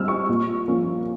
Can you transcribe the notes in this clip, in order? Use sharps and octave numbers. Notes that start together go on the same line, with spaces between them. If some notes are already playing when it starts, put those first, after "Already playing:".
Already playing: G3 C4 E6 F6
C#6
A#2
F3 A#3 C#4